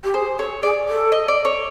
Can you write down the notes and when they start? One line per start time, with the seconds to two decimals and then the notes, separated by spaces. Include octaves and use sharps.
0.04 G4
0.14 G#4 C5
0.38 A4 C#5
0.62 G#4 D5
0.88 A4
1.12 D#5
1.28 D5
1.45 C#5